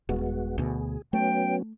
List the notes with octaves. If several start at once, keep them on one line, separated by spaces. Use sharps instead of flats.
D#1 G#3 B3 F#4
D2 B2 G#4
F#3 A3 B3 C#4 G5